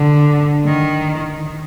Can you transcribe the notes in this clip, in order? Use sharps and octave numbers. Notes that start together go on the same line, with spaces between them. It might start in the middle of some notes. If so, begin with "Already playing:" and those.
Already playing: D3
D#3